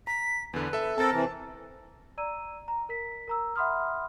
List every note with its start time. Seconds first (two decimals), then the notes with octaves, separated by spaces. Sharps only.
0.07 A#5 B6
0.53 E2 D3 B4
0.73 A4 E5
0.98 C4 A4 A#4 A5 A6
1.12 C3 E3
2.18 D5 A#5 E6 D#7
2.68 A#5
2.89 A#4 B6
3.28 A#4 A#5 E6
3.56 E5 F#5 B5 C6 D#6 F6